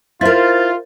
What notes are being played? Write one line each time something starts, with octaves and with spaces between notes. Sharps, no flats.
E4 F4 A#4 C5 A6